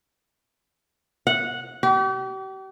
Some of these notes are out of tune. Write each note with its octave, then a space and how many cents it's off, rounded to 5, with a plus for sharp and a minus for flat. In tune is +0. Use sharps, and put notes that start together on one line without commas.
F#5 -10
G4 -40